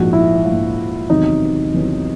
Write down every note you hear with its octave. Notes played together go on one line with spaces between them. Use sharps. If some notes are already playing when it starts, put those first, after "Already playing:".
Already playing: A#1 G#2 F3 F#4
E4
A#1 G#2 F3
E2 C3 D#3 F#3 B3 D#4
E2 C3 D#3 F#3 B3